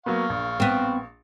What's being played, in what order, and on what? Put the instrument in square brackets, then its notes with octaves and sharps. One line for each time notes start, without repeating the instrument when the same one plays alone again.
[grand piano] F#3 A#3 B3 [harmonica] F5 C#6
[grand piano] A#1
[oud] B3 C4